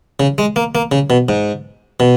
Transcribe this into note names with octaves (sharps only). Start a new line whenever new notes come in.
C#3
G#3
A#3
A#3
C#3
B2
G#2
B2